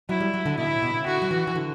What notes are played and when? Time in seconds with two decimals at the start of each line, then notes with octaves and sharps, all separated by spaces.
0.09 F#3 E4
0.20 G3
0.34 F#3
0.46 D3
0.57 B2 E4
0.70 A2
0.82 B2
0.94 C#3
1.06 D3 F#4
1.22 F#3
1.31 E3
1.47 E3
1.55 D3